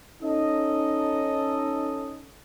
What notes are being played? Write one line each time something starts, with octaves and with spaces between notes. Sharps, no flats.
C#4 D#4 A4 D#5